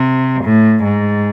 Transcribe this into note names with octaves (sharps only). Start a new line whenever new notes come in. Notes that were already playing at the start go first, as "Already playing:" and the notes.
Already playing: C3
A2
G#2